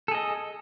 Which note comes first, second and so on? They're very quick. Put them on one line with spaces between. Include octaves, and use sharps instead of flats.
A4 G#4 D#5